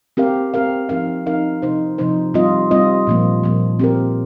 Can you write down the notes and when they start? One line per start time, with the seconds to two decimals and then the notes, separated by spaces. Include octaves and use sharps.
0.17 C4 G4 A#4 F5
0.54 C4 G4 A#4 F5
0.89 F3 C4 D#4 A#4 F5
1.26 F3 C4 D#4 A#4 F5
1.62 C3 F3 D#4 C5
1.98 C3 F3 D#4 C5
2.34 G3 C4 F4 D#5
2.71 G3 C4 F4 D#5
3.07 A#2 F3 A#3
3.44 A#2 F3 A#3
3.79 C4 G4 A#4